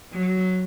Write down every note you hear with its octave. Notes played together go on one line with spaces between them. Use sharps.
F#3